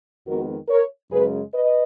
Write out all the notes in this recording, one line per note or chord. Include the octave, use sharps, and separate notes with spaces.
F2 D#3 G#3 B3 F#4 A#4
A#4 C#5
F#2 C#3 G#3 G#4 B4
B4 D#5